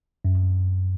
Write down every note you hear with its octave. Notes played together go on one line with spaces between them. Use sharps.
F#2